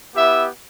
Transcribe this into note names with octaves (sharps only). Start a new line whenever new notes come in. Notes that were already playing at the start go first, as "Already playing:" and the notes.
B3 E4 G4 E5